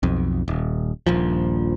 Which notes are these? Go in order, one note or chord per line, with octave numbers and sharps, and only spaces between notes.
B1 F2
D#1
D#1 A#1 F3